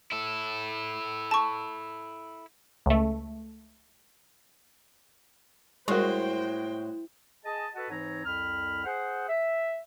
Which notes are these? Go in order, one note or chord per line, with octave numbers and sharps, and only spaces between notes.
E4 A4
A5 C#6
C#2 A3
A2 G3 G#3 F#4 A#4 C5 G5
G#4 D#5 A5
F#4 A4 B4 D#5 F#5 A5
G#2 E3 C4 D#4 C#5 A#5
C2 F2 B5 F6
G#4 C5 F#5
E5